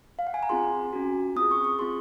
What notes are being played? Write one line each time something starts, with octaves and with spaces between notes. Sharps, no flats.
F5
F#5
G#5
A#5
C4 F4 G#4 C6
C#4 F#4
C4 F4 G#4 D#6
C#6
C#6
C4 F4 G#4 C6